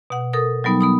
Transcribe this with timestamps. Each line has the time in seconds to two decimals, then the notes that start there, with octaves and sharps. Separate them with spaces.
0.10 B2 F#5
0.33 A4 A#4 D#6
0.64 F#3 G3 B3 D#4
0.81 B3 B5 D#6